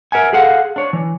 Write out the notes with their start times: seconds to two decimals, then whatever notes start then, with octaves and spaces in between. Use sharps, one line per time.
0.12 A#4 E5 F#5 G#5
0.33 G#4 A4 F5 F#5
0.76 D4 C#5
0.93 E3